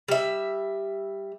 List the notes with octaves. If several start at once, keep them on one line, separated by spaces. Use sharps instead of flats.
G3 E5